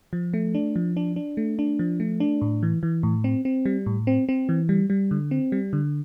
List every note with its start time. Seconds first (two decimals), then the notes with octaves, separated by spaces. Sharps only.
0.13 F3
0.34 A3
0.54 D4
0.76 F3
0.97 D4
1.16 D4
1.37 A3
1.59 D4
1.79 F3
2.00 A3
2.20 D4
2.41 A2
2.63 E3
2.83 E3
3.03 A2
3.24 C4
3.45 C4
3.66 G3
3.86 A2
4.07 C4
4.29 C4
4.49 E3
4.69 G3
4.90 G3
5.11 D3
5.31 C4
5.52 G3
5.73 D3